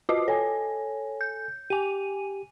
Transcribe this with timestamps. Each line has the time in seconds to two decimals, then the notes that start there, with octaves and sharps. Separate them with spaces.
0.09 F4 F#4 D#5
0.28 A4 C#5 G#5
1.21 G6
1.70 G4 G#5 D#7